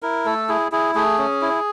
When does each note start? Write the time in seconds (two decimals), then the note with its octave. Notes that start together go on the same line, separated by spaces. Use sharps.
0.02 E4 A#4
0.26 A3 A4
0.49 E4 G#4
0.72 E4 G#4
0.95 A3 G#4
1.18 C#4
1.41 E4